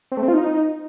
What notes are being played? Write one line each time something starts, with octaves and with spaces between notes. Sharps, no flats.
C4
A3
C4
F4
D#4